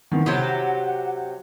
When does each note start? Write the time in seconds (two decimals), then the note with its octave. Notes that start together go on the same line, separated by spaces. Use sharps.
0.12 D#3 E3 C4 F#5
0.26 C3 F#3 E4 G4